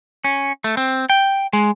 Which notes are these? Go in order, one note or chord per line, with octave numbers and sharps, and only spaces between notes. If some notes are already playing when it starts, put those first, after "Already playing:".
C#4
A3
C4
G5
G#3